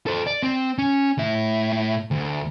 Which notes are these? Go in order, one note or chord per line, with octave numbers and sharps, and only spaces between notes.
A4 C5
D5
C4
C#4
A2 E5
D2